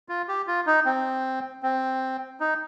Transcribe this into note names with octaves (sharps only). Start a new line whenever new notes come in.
F4
G4
F4
D#4
C4
C4
D#4